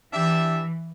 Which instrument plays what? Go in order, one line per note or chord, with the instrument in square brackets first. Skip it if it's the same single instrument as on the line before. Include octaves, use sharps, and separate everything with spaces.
[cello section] E3 [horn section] D4 G4 E5